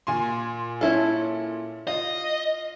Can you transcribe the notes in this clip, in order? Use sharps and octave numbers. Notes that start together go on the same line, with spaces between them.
A#2 G#5 C6
C#4 E4 A4
F4 D#5